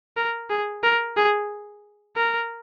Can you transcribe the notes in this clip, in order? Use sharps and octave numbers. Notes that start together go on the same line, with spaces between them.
A#4
G#4
A#4
G#4
A#4